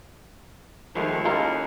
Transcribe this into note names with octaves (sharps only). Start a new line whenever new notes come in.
D#2 D#3 F3 G#3 A3
G#3 C#4 E4 F4 A4 A#4 D#5